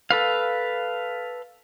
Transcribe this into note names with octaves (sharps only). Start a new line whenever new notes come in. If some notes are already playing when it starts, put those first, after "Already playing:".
A4 B4 F5